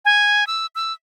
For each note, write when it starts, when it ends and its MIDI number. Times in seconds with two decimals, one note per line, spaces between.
0.05 0.47 80
0.47 0.66 88
0.75 0.93 88